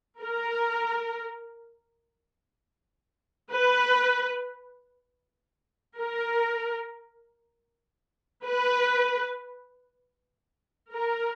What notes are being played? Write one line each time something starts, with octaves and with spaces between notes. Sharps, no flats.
A#4
B4
A#4
B4
A#4